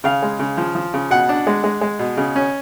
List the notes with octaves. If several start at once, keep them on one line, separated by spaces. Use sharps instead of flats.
C#3 F5
G#3
C#3
F3
F3
C#3
B2 F#5
D4
G#3
G#3
G#3
B2
C#3
C#4